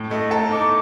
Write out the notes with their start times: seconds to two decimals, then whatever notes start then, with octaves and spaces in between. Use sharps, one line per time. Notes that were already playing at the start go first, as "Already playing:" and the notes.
Already playing: A2
0.11 A3 D#5
0.31 A4 A#5
0.51 D#4 D6